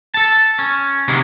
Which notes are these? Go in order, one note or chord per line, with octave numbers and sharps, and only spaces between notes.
A4 A5
C#4
C3 D#3 F#3 G#3 A#3 B3